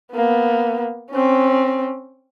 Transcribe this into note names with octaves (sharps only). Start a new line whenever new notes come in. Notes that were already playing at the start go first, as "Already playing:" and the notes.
A#3 B3
C4 C#4